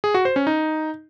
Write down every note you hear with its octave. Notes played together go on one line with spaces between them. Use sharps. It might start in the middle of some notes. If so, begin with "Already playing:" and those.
G#4
F#4
C5
C#4
D#4